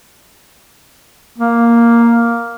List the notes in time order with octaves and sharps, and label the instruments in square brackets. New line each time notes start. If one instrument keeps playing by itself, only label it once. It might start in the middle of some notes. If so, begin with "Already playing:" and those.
[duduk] A#3